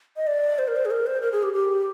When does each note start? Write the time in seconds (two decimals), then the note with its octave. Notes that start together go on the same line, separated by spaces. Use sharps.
0.17 D#5
0.27 D5
0.59 C5
0.68 A#4
0.76 C5
0.85 G#4
0.91 A#4
1.07 C5
1.22 A#4
1.32 G#4
1.43 G4
1.54 G4